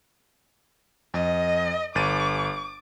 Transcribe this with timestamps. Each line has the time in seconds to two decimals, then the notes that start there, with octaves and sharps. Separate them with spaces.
1.14 F2 D#5
1.95 G1 D6 A6 D#7